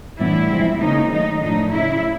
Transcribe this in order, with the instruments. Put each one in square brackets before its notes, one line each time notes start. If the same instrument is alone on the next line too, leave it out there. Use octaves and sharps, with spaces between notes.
[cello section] A2 E3 G3 B3 D4 E4
C3 F3 G#3 C4
C#3 F3 A#3 C#4 D#4
D#3 F#3 A3 D#4
A2 F3 A3 D4 D#4
C#3 F#3 A3 E4